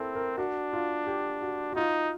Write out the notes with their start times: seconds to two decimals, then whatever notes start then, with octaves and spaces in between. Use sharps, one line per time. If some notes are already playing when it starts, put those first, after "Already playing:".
Already playing: C4 E4 A4 A#4
0.15 A#4
0.37 D4 F#4
0.73 F4
1.07 G4
1.42 F#4
1.72 F#4
1.76 D#4 F4